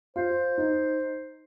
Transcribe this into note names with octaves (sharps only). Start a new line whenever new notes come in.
F4 C5
D#4